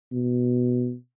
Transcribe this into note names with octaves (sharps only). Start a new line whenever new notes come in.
B2